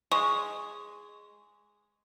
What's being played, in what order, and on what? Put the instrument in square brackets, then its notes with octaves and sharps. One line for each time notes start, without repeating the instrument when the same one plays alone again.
[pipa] G#3 [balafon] C#6